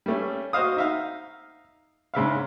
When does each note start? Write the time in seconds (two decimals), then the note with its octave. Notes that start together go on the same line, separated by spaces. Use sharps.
0.06 G3 A3 C#4
0.53 F#4 C5 D#5 F5 D#6
0.76 D#4 E5 F5
2.14 G#2 C#3 E5 F5